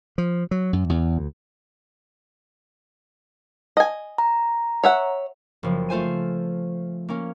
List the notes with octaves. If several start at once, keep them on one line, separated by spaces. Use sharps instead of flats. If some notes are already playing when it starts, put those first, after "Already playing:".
F3
F#3
F#2
E2
D2
D#5 G#5
A#5
C#5 E5 F#5
F#1 F3
A3 F4 C5 G#5 D#7
A#3 C#4